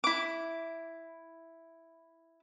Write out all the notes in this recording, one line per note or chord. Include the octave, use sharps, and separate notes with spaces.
E4 D6